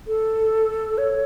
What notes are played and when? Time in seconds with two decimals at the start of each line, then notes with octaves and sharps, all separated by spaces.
0.07 A4
0.98 C#5